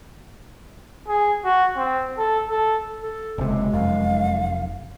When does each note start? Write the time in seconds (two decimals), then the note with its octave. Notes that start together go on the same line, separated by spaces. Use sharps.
1.08 G#4
1.44 F#4
1.77 C4
2.18 A4
2.49 A4
3.02 A4
3.38 F#1 C3 G#3
3.73 F1 F#2 F5